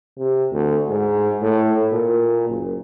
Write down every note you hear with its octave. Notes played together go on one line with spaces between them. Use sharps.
C3
D2
G#2
A2
A#2
F#1